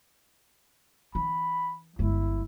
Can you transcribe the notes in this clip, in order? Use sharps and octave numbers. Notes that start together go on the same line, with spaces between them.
E3 D4 B5
G1 G#3 E4